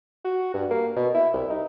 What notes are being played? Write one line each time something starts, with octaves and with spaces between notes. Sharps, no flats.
F#4
G2
A#3
B2
E4
C2
D#4